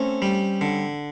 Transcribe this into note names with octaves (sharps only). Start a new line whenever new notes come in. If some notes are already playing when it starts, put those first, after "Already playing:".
Already playing: A3 C4 C#4
G3
D3